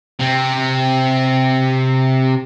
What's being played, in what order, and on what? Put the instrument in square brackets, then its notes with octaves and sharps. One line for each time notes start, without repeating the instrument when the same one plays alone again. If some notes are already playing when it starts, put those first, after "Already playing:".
[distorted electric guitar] C3 C4